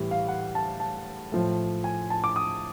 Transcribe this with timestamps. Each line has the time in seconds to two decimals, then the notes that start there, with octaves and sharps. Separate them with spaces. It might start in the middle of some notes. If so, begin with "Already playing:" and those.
Already playing: A2 E3 G3
0.11 F5
0.29 F#5
0.55 A5
0.80 A5
1.32 A2 F3 A3
1.84 G#5
2.10 A5
2.24 D6
2.36 D#6